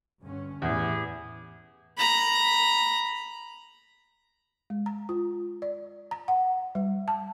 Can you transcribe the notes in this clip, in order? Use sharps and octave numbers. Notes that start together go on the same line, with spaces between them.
G2 D3 C#4
E2 A2 E3 E4 G4 G#4
A#5 B5
G#3
A#5
F4
D5
A#5
F#5
G3
A5